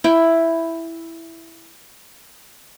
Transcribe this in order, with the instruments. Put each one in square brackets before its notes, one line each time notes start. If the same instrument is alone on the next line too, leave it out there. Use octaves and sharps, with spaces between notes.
[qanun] E4 G5